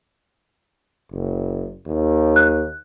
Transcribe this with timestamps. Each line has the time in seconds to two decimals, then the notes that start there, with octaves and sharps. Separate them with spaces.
1.12 F#1
1.86 D#2
2.36 F#6